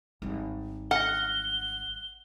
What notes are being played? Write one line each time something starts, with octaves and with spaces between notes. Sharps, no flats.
G#1 G3
F#5 F6 A#6 G7
F#6